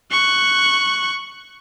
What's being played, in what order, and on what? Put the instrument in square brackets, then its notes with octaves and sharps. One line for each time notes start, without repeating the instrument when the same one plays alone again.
[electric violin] C#6 F#6